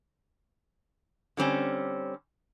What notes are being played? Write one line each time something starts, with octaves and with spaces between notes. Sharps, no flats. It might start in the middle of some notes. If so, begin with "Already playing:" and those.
D3 G3 C4 C#4